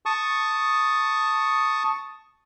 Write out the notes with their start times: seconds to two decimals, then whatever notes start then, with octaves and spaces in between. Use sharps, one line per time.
0.06 A5 C#6 D#6